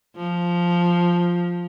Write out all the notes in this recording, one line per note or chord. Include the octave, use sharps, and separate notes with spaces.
F3